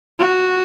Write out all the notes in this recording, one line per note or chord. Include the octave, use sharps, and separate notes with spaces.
F#4